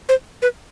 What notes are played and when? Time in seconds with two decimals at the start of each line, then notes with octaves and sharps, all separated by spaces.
0.09 C5
0.42 B4